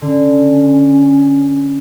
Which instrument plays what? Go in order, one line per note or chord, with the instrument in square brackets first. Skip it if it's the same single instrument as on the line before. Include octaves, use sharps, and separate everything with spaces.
[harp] D3 [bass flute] C#4